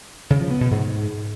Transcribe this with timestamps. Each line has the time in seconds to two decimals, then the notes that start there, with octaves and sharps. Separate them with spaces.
0.30 C#3
0.40 F3
0.51 B3
0.61 B2
0.71 G#2